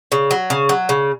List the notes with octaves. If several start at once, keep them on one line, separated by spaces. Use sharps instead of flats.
C#3
F#3
C#3
F#3
C#3